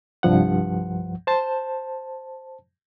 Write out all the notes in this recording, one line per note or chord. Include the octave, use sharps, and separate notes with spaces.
C2 G2 F3 F#5
C5 A5